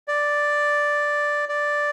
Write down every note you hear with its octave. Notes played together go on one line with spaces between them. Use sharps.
D5
D5